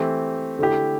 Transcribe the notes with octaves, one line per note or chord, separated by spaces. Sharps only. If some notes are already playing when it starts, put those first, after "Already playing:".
Already playing: E3 A3 C4 G4
D3 A3 E4 G4